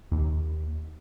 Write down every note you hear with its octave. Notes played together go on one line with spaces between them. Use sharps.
D#2